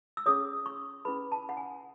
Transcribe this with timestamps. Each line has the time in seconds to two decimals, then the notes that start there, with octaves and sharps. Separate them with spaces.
0.17 E6
0.26 C#4 G#4 C#5 D#6
0.66 C#6
1.05 C#4 E4 G#4 B4 B5
1.32 A5
1.49 F#5
1.57 G#5